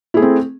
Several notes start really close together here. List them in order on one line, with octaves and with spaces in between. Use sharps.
E4 G#4 A3 C4